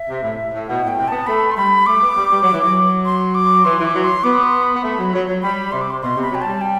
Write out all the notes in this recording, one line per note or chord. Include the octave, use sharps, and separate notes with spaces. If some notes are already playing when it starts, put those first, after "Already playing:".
Already playing: E5
C3
A2
A2
B2 F#5
A2 G5
C3
B3 A5
A3 B5
C6
G3 B5
A3 D6
B3
G3
G3
F#3
E3
F#3
C6
D6
E3 C6
E3
D6
F#3
C6
B3 D6
C6
B5
B3
A3
F#3
F#3
F#3
G3 B5
C3 C6
D6
C6
B2 C6
C3
B5
F#3 G5
G3 A5
G5